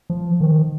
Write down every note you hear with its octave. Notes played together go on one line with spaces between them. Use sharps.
F3
D#3